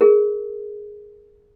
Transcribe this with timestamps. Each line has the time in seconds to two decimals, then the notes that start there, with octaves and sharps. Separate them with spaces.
0.01 G#4 A#4